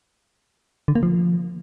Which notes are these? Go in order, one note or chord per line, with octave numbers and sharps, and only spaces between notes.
D3
A#3
F3